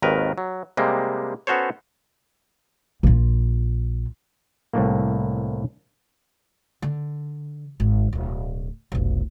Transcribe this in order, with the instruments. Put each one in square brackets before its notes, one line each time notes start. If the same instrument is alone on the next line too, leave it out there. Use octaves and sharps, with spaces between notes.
[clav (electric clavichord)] G#1 D#2 D#3 A#4 B4
F#3
C3 G3 G#3 A#3
B3 C#4 F#4 A4 C5 C#5
[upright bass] A#1 F4
[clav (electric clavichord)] C2 A2 A#3
[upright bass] D3
G#1
D1 B2
F1 B1